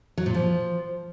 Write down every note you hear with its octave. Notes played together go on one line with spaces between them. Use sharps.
F#3
A#2
F3